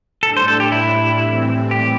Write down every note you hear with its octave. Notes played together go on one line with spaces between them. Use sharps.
A2 G3 D4 A4
C5
A4
G4
E4
A2 E3 G3 C4
G4